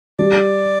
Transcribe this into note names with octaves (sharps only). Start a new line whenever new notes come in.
G3 D5